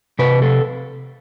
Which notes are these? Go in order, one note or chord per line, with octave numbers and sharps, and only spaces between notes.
C3 B4
A4